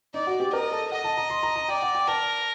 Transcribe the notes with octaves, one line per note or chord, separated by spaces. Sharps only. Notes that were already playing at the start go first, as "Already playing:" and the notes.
D#4 D5
F#4
G4
A#4 D#5
A4
D#5 F#5
A5
A#5
C6
A#5
A#5
D5 G5
F#5
G5
A#4 A5